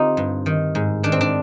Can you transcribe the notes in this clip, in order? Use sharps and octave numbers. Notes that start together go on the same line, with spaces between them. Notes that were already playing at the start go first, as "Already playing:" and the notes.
Already playing: D3 C4 D#4 F4 G4
G2
D#3
G#2
D#3 D4
C4
D4